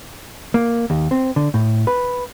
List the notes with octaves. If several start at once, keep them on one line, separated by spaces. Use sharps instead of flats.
A#3
D#2
C4
D3
A2
B4